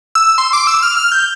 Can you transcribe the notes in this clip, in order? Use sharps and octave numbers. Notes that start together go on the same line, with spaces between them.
E6
C6
D6
E6
F6
F6
G6